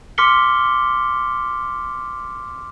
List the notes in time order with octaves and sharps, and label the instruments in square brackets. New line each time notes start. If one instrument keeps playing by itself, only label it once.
[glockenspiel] C6 D6 F6 B6 C#7 G7